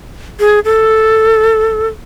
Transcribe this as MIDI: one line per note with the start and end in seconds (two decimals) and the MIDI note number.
0.40 0.60 68
0.65 1.88 69